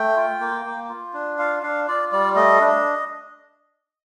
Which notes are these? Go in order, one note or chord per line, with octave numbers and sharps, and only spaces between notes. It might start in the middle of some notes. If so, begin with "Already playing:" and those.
Already playing: A3 G5
F4
A#3
A#3
F4
D4
F4 F5
D4 F5
F4 D5
G3 D5
A3 D#5
D4